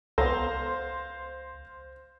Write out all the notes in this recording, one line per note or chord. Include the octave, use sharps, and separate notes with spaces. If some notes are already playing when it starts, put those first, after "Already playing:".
C#2 B3 A4 C5 F5 C6 A#6